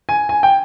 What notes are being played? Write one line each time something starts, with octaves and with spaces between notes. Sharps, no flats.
G#5
G#5
G5